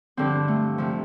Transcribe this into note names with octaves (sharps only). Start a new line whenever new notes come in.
G2 D3 F3 C4
A3
C3 F3